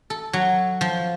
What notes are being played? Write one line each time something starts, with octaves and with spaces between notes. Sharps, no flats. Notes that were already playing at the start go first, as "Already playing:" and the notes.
A4
F#3
F3